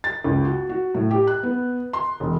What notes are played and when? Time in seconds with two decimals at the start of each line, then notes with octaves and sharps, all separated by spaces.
0.04 A6
0.24 C#2
0.45 F#4
0.69 F#4
0.95 A2
1.11 G4
1.27 F#6
1.43 B3
1.93 C6
2.20 E1